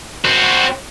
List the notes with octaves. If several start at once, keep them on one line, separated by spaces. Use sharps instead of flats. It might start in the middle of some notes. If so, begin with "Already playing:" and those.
C4 F#4